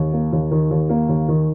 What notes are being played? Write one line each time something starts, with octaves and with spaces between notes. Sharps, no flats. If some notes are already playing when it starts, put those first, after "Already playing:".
Already playing: D#2
A#3
D#2
D#3
D#2
A#3
D#2
D#3